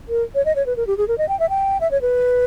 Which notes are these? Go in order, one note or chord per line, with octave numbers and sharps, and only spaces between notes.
A#4
C#5
D#5
C#5
B4
A#4
G4
G#4
A#4
D#5
G5
E5
G5
E5
C#5
B4